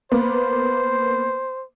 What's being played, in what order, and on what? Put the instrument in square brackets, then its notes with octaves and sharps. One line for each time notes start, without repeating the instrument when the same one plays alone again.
[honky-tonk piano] A#3 B3 [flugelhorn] C5